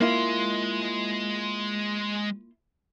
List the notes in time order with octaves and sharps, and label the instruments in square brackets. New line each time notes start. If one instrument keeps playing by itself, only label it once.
[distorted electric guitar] G#3 C6 [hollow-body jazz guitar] A#3 E4 F4